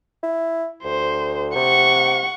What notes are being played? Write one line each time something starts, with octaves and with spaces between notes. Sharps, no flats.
E4
D2 C5
C3 F#5 C#6